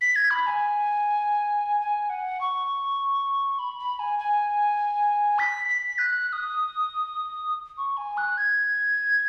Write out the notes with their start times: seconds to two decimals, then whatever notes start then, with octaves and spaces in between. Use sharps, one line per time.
0.01 B6
0.16 G#6
0.31 B5
0.47 G#5
1.81 G#5
2.10 F#5
2.41 C#6
3.59 B5
3.79 B5
3.99 G#5
4.19 G#5
5.39 B6
5.68 B6
5.98 F#6
6.28 F#6
6.33 D#6
7.78 C#6
7.97 G#5
8.17 F#6
8.38 G#6